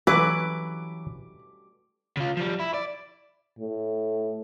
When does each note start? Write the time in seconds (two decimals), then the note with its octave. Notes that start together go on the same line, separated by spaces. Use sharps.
0.07 E3 F#3 B4 D6
2.17 C#3 F4
2.37 F3 G3
2.60 E4
2.74 D5
3.59 A2